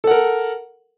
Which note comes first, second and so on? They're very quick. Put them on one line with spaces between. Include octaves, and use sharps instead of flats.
A4 F#5 A#4